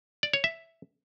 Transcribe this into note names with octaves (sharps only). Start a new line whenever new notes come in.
D5
C#5
E5